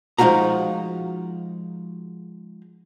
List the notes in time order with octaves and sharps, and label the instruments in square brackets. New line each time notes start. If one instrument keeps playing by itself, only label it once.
[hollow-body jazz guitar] F3 G#3 D#4 F4 F#4 A#5